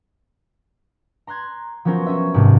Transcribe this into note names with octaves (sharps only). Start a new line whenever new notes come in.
A#5 C6 F#6 G#6
F3 F#3 B3 C#4 A#4 C5
C#4 C#5 E5
G#1 G#2 C3